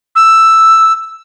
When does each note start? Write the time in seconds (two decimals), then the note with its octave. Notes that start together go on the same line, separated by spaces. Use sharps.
0.16 E6